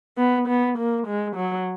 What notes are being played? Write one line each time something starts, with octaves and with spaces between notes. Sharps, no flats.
B3
B3
A#3
G#3
F#3